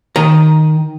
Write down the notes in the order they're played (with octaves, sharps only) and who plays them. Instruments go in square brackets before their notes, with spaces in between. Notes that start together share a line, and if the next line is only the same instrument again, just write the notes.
[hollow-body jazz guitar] D#3 A#5